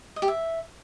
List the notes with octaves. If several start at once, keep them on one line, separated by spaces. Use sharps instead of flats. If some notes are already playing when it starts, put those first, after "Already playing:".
D#5
G4
E5